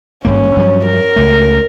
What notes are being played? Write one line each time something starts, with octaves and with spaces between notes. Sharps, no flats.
G#1 G2 A#3 C#4
G2 F3 F#3
A#4
C#2 A3